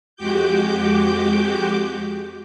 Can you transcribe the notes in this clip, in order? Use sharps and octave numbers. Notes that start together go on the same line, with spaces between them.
F2 G#3 F#4 G4 D6 G6